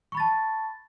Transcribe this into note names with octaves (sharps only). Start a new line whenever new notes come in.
A5 B5 C#6 A6